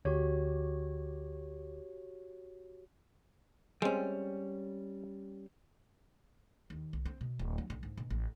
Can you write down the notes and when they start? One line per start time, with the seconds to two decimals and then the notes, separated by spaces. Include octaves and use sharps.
0.05 D2 F#4 G4 C#5
3.82 G3 G#3 C4 C#4
6.70 D#2
6.93 B1
7.05 C4
7.21 B2
7.39 D1
7.58 F#3
7.70 B1
7.83 G#2
7.98 B2
8.10 A1